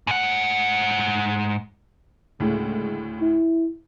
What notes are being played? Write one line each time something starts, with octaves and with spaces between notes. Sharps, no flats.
G#2 F#5
D2 A2 C#3 G#3
E4